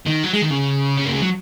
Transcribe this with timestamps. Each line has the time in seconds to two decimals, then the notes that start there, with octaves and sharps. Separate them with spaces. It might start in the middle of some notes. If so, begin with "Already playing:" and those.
0.06 D#3
0.24 F#3
0.34 G#3
0.42 D#3
0.51 C#3
0.97 C#4
1.05 A#3
1.12 G#3
1.21 F#3